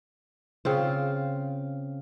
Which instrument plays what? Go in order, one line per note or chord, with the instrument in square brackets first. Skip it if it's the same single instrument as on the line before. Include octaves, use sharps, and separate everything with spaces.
[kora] C#3 C4 F4